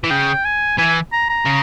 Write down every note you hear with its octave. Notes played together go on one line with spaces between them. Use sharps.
E3
C#3 G5
G#5
E3 G#5
A#5
A#5
C#3